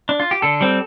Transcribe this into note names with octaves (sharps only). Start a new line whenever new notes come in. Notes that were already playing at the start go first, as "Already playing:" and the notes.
D4
F4
G4
D3 A4
G3 C4